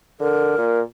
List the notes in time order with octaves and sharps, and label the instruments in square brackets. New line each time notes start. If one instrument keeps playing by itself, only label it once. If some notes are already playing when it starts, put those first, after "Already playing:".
[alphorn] D3 [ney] A#4
[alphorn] A#2